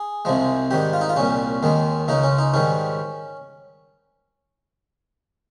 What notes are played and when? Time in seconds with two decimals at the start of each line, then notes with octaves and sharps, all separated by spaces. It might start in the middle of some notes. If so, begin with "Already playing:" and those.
Already playing: G#4
0.25 C2 C3 F3 G#3
0.71 G#2 D#3 G3 G4
0.93 F4
1.01 D#4
1.09 F4
1.16 C2 A#2 G3 C#4
1.63 D#2 D#3 G#3
2.08 C#2 C#3 G#3 D#4
2.24 C#4
2.38 D#4
2.54 G#2 D#3 G3 C#4